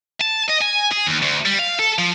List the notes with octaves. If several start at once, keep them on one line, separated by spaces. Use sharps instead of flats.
A5
D#5
G#5
G#4
D#2
D2
G3
F5
A4
F3